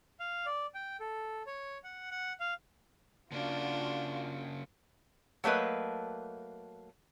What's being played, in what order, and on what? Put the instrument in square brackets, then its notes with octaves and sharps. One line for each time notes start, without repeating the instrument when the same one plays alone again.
[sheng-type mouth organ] F5
D5
G5
A4
C#5
F#5
F#5
F5
[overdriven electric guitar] C#3 A#3 [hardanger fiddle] D4 [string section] F4 F#4
[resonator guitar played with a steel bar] F#3 A3 A#3 B4 D#5